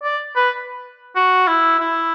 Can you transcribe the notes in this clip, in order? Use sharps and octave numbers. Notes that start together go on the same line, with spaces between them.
D5
B4
F#4
E4
E4